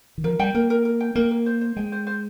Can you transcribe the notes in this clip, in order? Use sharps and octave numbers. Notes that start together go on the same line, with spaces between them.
D#3
F3 A#4
G3 G5
A#3 A#4
A#4
A#4
G5
A#3 A#4
A#4
C5
C5
G#3 G5
C5
C5